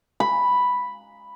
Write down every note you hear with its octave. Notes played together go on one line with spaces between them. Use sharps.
B5